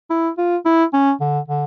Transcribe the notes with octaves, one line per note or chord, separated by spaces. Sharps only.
E4
F4
E4
C#4
D3
D3